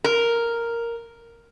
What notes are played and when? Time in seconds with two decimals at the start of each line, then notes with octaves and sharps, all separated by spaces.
0.04 A#4